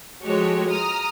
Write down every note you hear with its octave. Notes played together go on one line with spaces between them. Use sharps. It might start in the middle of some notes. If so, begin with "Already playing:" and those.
F3 G#3 F#4 G4 A4 C#5
A#5 D#6 F6